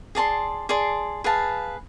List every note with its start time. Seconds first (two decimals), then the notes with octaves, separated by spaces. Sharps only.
0.15 G#4 D5 A5 C6
0.69 G#4 D5 A5 C6
1.24 G#4 B4 F5 A5